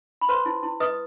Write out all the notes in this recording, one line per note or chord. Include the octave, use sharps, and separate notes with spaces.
B5
B4 C5 C6
E4
E4
B4 D#5 D#6